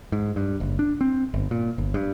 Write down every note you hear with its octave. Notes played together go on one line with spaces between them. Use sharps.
G#2
G2
F#1
D4
C4
G1
A#2
G1
G2